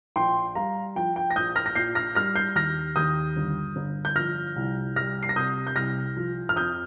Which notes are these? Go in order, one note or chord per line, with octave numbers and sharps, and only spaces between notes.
A#1 G5 C6
G3 F5 A#5
F3 G5
G5
A#6
A#1 D#6 G6
F6 A#6
A#6
A#2 G6 C7
F6 A#6
G3 F6 A#6
G6 C7
D#2 F6 A#6
D#2 D#6 G6
G1
G1
G6
F3 F6 A#6
C2
G3 F6 A#6
C7
A#6
C3 D#6 G6
G6
C2 F6 A#6
F3
F6
F2 D#6 G6